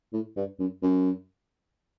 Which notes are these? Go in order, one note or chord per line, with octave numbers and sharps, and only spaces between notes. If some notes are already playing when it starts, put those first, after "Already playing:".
A2
G2
F#2
F#2